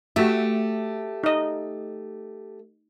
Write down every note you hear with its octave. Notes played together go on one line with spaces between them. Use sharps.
A3 F#4 G4 E5
D#4 D#5